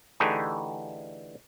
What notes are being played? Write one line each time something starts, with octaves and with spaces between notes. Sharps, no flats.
D3 E3 A3 D#4 G4 G#4